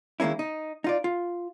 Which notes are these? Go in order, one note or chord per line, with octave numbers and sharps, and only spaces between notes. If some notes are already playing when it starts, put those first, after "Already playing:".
D#3 G#3 A#3 C#4 E4
D#4
D#4 F4 D5
F4